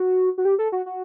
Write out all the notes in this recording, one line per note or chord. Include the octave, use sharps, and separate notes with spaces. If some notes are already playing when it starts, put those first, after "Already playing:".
Already playing: F#4
F#4
G4
A4
F#4
F#4